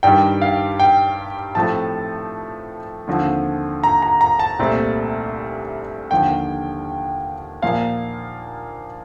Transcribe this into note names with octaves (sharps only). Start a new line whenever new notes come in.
G2 D#3 G3 G5
F5
G5
A2 F3 A3 C4 A5
D#2 D3 F3 C4
A#5
A#5
A#5
A5
C2 A#2 A3 C4
D#2 D3 F3 G5
A#2 F3 A#3 F5